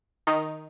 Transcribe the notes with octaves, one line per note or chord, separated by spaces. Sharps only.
D#3 D#4